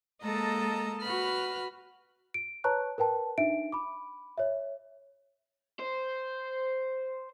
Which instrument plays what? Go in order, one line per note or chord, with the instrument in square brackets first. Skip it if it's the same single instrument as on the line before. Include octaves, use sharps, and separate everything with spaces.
[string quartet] G#3 A#3 A4 D#5 A5 A#5
F#4 B4 B5 F6
[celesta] D7
B4 C#5 A5 A#5 C#6 F#6
A#4 B4 G5 A5
D4 D#4 E5 D7
B5 D6
C#5 E5
[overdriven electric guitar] C5